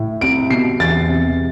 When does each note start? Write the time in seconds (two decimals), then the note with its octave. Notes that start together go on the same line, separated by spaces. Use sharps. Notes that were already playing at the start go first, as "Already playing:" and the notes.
Already playing: A2
0.21 C2 D7
0.50 B2 C7
0.80 E2 A6
1.09 C3